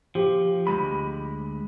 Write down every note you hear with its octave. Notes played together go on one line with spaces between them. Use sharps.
F3 G4
D2 G#3 B5